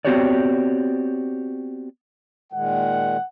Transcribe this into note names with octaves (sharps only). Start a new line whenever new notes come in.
B3 C4 F#4 G4 C#5 D5
A#2 D#3 G#3 F#5